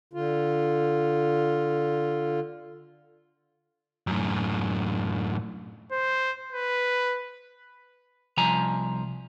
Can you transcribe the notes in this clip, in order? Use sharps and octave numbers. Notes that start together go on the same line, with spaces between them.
D3 F4
F#2 A2
C5
B4
C2 F3 G#5 A#5